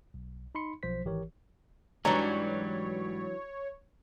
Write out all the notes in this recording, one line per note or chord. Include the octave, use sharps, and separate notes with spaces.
B1
D#4 B5 C6 C#7
B1 F3 C5 B6
G#1 E3 G4 A#4 C#5
G#2 E3 F#3 G3 D4 C#5 A#5